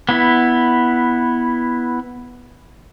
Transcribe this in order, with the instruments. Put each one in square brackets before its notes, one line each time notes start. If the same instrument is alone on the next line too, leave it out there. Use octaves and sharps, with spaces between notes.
[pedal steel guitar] B3 E4